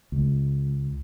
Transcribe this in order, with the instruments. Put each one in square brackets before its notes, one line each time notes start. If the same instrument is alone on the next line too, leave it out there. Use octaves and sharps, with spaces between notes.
[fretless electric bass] C#2